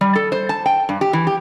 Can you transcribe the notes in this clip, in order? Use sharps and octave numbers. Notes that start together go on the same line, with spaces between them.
G3
A4
C5
A5
G5
G2
G4
E3
G4